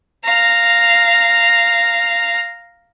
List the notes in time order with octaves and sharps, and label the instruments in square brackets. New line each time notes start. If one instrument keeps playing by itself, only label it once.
[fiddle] F5 A#5